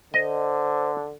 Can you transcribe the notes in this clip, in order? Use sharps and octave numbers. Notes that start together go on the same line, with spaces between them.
D3 C5 D#5